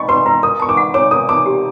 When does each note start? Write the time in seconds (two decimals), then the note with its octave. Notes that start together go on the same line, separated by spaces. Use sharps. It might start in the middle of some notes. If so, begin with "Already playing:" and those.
Already playing: D#5 B5 C#6
0.08 B4 C6
0.26 B4 A#5
0.43 A#4 D#6
0.60 A5 C#6
0.69 D6
0.77 F#5
0.94 C#5 D6
1.11 A#4 D#6
1.29 A5 D6
1.46 G4